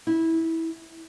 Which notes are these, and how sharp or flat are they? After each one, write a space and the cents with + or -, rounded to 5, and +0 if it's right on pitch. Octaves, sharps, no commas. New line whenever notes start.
E4 -15